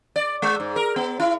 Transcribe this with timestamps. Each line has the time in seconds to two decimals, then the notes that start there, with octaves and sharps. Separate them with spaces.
0.16 D5
0.42 G#3
0.60 G#2
0.76 A#4
0.96 B3
1.20 E4